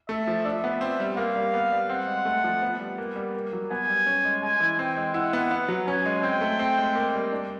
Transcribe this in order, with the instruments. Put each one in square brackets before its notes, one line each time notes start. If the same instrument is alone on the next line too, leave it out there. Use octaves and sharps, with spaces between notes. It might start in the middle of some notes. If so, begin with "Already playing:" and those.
[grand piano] A3 [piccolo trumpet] E5
[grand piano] F3
[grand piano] D4 [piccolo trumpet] E5
[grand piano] B3
C4
G3
[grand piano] A#3 [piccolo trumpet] F5
[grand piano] G3
B3
G3
[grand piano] C4 [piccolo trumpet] F#5
[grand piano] G#3
A3
F3
B3
G3
A#3
G3
A#3
F#3
[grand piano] B3 [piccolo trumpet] G#5
[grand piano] G3
C#4
G#3
[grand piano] G#3 [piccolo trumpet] G#5
[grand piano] E3
[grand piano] C4 [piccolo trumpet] G5
[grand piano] G#3
[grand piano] E4 [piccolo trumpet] F#5
[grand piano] B3
B3
F#3
[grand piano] C#4 [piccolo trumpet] G#5
[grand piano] G#3
[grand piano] C4 [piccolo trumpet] G5
[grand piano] A3
C4
G#3
A#3
G3
D4